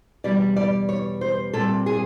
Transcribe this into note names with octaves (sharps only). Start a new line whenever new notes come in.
E2 B2 G3 D5
D5
C#5
C5
A#2 G3 C4 A4
G#4